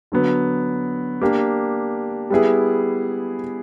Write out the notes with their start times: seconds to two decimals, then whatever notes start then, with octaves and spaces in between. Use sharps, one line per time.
0.12 D3 F#3 B3
1.21 A#3 D4 G4
2.30 G3 B3 E4 G#4